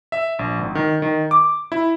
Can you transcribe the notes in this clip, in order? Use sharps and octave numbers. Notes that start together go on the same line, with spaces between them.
E5
A#1
G#1
D#3
D#3
D6
E4